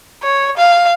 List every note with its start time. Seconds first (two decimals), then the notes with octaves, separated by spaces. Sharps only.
0.23 C#5
0.58 F5